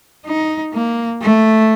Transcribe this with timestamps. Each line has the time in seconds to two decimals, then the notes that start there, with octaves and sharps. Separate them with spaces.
0.26 D#4
0.73 A#3
1.21 A3